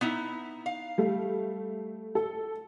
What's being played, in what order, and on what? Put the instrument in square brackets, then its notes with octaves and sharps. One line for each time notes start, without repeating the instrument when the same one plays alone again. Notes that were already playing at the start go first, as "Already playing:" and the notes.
[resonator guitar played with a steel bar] B3 D#4 E4
F5
[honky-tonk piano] G3 A3
A4